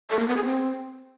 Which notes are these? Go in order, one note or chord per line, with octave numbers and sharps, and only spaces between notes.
A4
A#3
B3
G#4
C4